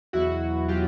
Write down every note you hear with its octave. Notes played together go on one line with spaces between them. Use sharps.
E2 B2 F#3 E4 F#4
B2 F#3 F4 G4